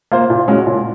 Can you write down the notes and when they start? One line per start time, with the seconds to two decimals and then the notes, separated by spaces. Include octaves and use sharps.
0.12 A#3 F4 C5
0.30 A#2
0.48 G#3 C#4 F#4
0.67 A#2